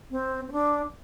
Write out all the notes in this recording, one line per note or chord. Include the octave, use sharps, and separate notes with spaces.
C4
C4
D4